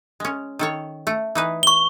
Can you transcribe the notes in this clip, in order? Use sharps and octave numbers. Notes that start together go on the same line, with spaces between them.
G#3 C#4
D#3 A4 C#5
A3
E3 D#4 B4
C#6 G7